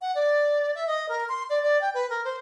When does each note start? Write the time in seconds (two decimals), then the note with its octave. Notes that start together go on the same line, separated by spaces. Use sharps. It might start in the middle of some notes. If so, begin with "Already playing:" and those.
0.02 F#5
0.15 D5
0.75 E5
0.87 D#5
1.09 A#4
1.29 C6
1.50 D5
1.62 D5
1.81 G5
1.94 B4
2.10 A#4
2.25 C5